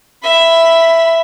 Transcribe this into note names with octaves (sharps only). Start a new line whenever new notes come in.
E5 B5